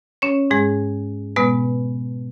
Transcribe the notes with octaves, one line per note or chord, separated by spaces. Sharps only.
C#4 C#5
G#2 G#3 G#4
B2 G#3 B3 B4